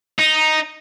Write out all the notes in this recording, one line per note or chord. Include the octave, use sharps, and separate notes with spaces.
D#4